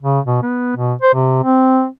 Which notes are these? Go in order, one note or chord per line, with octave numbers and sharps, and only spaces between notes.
C#3
B2
B3
B2
C5
C3
C4